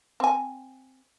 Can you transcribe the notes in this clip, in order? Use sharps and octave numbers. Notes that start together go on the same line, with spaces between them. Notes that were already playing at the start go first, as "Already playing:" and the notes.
C4 G#5